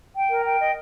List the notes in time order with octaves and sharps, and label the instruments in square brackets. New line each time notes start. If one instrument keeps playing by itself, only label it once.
[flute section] G5
A#4
G5
D#5